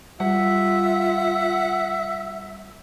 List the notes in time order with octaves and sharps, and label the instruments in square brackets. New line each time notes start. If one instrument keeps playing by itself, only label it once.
[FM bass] G3 [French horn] F4 [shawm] E5 [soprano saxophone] F#5